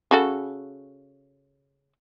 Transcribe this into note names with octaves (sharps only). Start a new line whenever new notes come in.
C#3 F#4 A4